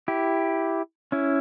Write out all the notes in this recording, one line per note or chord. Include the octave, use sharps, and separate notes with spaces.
E4 G4
C#4 E4